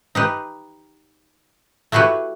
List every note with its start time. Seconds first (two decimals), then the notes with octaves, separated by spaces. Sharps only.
0.15 D#4 G4 B4
1.92 A3 E4 F#4 G4 B4